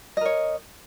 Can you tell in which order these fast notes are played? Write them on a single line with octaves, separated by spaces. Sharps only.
D#5 A#4 C#5